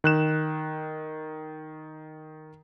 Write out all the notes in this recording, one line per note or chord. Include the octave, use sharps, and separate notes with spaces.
D#3 F#6 E7